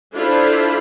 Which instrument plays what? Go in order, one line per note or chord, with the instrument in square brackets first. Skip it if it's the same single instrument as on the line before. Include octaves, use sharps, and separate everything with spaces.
[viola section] D4 E4 F4 A4 C5 B5